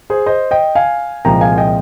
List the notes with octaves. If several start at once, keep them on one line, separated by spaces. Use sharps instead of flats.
G#4 C5
C5 D#5
D#5 G5
F5 G#5
C2 A#2 F3 G#3 G5 A#5
F5 G#5
D#5 G5